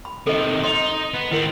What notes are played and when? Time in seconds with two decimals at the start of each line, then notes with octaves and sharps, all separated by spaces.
0.05 B5
0.27 C3 D#3 A4 D#5
0.64 D#4 D#5 C6
1.14 B3
1.31 D#3 C4 E4 A#4